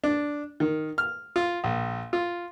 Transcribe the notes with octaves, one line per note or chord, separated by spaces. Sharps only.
D4
D#3
F6
F4
A#1
F4